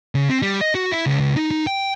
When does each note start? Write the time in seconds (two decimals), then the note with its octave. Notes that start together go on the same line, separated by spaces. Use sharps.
0.15 C#3
0.29 C4
0.42 G3
0.61 D#5
0.75 F#4
0.92 E4
1.06 C#2
1.20 C#2
1.36 D#4
1.51 D#4
1.67 G5